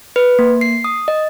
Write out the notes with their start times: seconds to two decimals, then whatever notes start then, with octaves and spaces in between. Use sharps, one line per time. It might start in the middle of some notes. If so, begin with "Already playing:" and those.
0.16 B4
0.39 A#3
0.61 C7
0.84 D#6
1.08 D#5